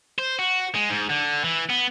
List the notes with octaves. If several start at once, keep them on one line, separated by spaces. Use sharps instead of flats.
C5
F#4
G#3
G#2
D3
E3
B3